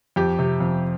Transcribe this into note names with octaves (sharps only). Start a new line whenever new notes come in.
F2 G4
C3
F2